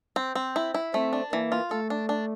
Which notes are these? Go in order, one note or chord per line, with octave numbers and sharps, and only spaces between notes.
C4
C4
E4
E4
A3 C4
D4
E3 A#3
F4
A3 A4
D4
D4